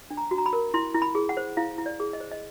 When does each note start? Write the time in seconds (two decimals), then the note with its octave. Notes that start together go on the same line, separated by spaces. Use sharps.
0.10 D4
0.17 A#5
0.31 F#4
0.38 A#5
0.46 B5
0.53 A#4
0.74 E4 C6
0.95 E4
1.02 B5
1.15 G#4
1.29 F#5
1.37 C5
1.57 E4 F5
1.78 E4
1.86 D5
2.00 G#4
2.13 D#5
2.20 C5
2.31 D#5